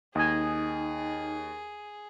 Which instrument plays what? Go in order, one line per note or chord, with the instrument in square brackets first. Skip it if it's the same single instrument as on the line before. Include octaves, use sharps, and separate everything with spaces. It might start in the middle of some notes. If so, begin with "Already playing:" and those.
[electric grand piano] D#2 [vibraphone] D#4 [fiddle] G#4 [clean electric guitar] D#5 G#5